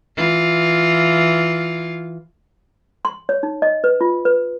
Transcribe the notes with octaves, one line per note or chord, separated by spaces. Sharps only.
E3 F4
C6
C#5
D#4
D#5
B4
F4
B4